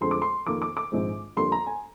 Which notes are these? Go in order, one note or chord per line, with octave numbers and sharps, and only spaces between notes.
F2 D3 G#3 C4 C6
D6
C6
F2 D#3 A#3 D6
D6
D6
A#1 G#2 D#3 G#3 C4
F2 D3 G3 A#3 C6
A#5
G#5